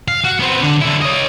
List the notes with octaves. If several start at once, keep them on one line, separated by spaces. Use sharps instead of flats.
F5
F#4
B3 C4
D3
D3 E4
C#5 D#5